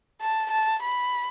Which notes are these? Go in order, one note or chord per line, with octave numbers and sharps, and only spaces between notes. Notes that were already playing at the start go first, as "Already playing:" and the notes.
A5
A5
B5